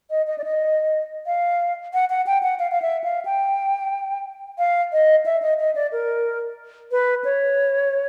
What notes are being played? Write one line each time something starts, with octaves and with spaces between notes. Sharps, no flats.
D#5
D#5
D5
D#5
F5
F#5
F#5
G5
F#5
F5
F5
E5
F5
G5
F5
D#5
E5
D#5
D#5
D5
A#4
B4
C#5